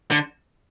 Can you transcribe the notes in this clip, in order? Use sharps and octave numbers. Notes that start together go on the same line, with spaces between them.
D3